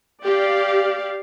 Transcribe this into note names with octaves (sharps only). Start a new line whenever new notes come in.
G4 D5 F5